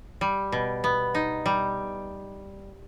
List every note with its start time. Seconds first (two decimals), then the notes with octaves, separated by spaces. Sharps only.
0.21 G3
0.52 B2
0.84 B3
1.15 D#4
1.46 G3